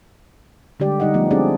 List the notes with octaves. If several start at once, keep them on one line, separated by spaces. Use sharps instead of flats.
D3 G3 G#3 G4 D5
D3 G3 D#4 D#5 F#5
F3 G3 A3 B3
G#3 C4 D4 G4 G#4 D5